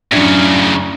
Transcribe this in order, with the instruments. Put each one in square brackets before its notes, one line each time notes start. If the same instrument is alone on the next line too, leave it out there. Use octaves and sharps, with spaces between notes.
[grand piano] F#2 D4 [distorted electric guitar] A2 C#3